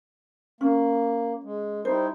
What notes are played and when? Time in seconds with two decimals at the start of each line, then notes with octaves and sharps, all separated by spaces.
0.61 A#3 C#4
1.44 G#3
1.85 G3 D#4 E4 C5